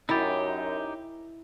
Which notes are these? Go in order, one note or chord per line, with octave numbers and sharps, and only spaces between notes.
F#2 D#4 E4 G4 A6